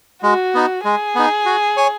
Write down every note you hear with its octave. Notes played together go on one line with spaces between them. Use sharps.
G#3 F#4
B3 D#4
G#3 G#4
B3 D#4
F#4
C#5 G#5